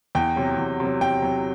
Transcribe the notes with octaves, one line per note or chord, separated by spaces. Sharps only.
E2 G5
C3 F#3
E2
C3 F#3
E2 G5
C3 F#3